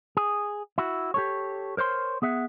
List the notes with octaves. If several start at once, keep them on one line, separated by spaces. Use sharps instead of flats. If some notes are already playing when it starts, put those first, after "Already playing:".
G#4
E4 F#4
G4 A4 C#5
A#4 C5 C#5 C6
B3 G#4 E5 F#5